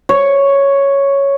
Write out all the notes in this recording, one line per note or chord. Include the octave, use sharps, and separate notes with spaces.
C#5